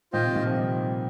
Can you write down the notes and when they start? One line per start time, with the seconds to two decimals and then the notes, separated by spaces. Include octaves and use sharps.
0.13 A#2 D#3 F4 C5 D#5 G5
0.24 C3
0.35 A#2 D#3
0.45 C3 F3
0.57 D#3 G3